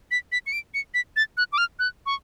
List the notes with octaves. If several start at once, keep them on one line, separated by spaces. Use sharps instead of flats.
B6
B6
C#7
D7
C#7
B6
A6
F#6
D6
F6
F#6
C#6